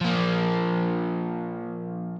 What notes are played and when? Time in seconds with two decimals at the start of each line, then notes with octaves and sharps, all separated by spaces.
0.01 F3 A#3